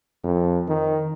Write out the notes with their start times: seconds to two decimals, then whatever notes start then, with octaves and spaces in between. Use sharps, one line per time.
0.23 F2
0.68 D#3